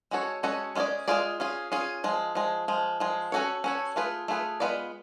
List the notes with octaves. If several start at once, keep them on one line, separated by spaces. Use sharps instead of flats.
G#3 C#4 F#4 A4 C#5
G#3 C#4 F#4 A4 C#5
G#3 C#4 F4 G#4 D5
G#3 C#4 F4 G#4 D5
C#4 F4 G#4
C#4 F4 G#4
F3 G#3
F3 G#3
F3 G#3
F3 G#3
C#4 F#4 A4 C#5
C#4 F#4 A4 C#5
A3 F4 G#4 B4
A3 F4 G#4 B4
G#3 B3 F4 B4 D5